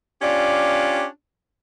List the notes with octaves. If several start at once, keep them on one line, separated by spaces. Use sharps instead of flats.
C#4 D4 F4 G4 D5